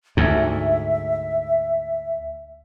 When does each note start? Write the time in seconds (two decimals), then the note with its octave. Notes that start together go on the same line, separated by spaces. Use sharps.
0.17 D2 G#2 E5